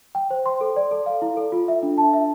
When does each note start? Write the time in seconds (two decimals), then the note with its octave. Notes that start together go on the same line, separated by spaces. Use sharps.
0.15 G5
0.30 C5
0.46 C6
0.61 A4
0.76 D5
0.91 A4
1.06 F5
1.22 E4
1.37 A4
1.52 F4
1.68 E5
1.83 D4
1.98 A5
2.13 E5